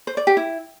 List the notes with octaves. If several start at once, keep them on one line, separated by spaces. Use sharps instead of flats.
C5
D5
G4
E4